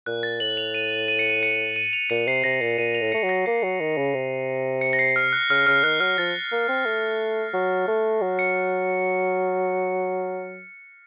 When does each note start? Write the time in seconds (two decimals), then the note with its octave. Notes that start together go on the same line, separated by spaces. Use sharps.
0.06 A#2 F#6
0.23 A6
0.40 A2 F#7
0.57 F7
0.74 D#7
1.08 D#7
1.19 C#7
1.30 D#7
1.43 C#7
1.76 D#7
1.93 F7
2.10 A#2 C#7
2.27 C3 C7
2.44 C3 A#6
2.61 A#2 C7
2.78 A#2 D#7
2.95 F7
3.01 A2
3.12 A3 C#7
3.23 F#3
3.29 A#6
3.46 A#3 C7
3.63 F#3
3.80 D#3
3.97 C#3
4.14 C3
4.81 C#7
4.93 A#6
4.99 C7
5.16 F6
5.33 F#6
5.50 C#3 F6
5.67 C#3 F6
5.84 D#3 F#6
6.00 F#3 F6
6.18 F3 A6
6.52 A#3
6.68 C4
6.86 A3
7.53 F#3
7.88 A3
8.21 F#3
8.39 C#7